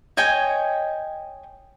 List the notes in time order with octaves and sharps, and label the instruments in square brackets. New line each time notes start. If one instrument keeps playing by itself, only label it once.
[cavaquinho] C#5 D#5 G5 G#5